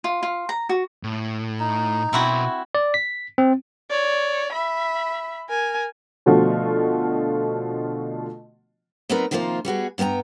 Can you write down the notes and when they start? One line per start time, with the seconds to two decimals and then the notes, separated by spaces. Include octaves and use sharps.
0.04 F4
0.23 F4
0.49 A#5
0.69 F#4
1.03 A2
1.60 D#4
2.13 B2 C4 E4 F#4 C6
2.75 D5
2.94 B6
3.38 C4
3.90 C#5 D5
4.53 E5 B5
5.49 A#4 G#5
6.26 B2 D3 F3 A3 F4 F#4
9.09 F#3 B3 C4 D#4 A#4 B4
9.31 C3 D#3 F3 A#3 F4 C5
9.65 G3 B3 F#4 G#4
9.98 G2 B3 A#4 G5 A#5